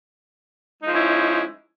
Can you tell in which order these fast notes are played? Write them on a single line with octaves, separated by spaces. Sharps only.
G#3 D#4 F3 C#4 E4